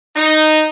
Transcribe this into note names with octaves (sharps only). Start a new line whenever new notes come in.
D#4